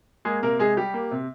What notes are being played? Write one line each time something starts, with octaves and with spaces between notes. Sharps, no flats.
G#3 A#3 G#4
C3 A#3 A#4
C3 G#3 G#4
G3 G4
A#3
C3